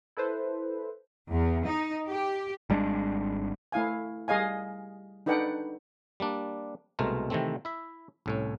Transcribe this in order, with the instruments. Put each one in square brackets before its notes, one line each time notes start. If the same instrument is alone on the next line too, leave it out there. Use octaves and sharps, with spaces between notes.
[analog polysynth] E4 A4 B4 C5
[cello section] E2
D#4
G4
[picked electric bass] G#1 G3 G#3 D4
[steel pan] A3 E4 F5 G#5
G3 G#4 D#5 F5 G#5
D4 D#4 A4 B4 F#5 G5
[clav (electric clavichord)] G3 A#3 D4
C2 B2 G#3 A3 A#4 C5
C3 D#3 E3 A3 C4
E4 E5
C2 A2 C#4